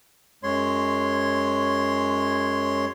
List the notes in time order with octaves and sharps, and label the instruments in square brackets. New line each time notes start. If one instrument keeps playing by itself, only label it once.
[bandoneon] F#2 G#3 C#5 C6